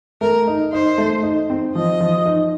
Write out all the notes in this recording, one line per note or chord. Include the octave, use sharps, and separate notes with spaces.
A3 A#4
D#4
D#4 C5
A3
D#4
C4
F3 D#5
F3
D#4